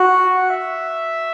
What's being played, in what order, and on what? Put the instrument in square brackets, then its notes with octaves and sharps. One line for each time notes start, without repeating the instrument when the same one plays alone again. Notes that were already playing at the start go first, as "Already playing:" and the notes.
Already playing: [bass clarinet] F#4
[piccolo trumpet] F#5
E5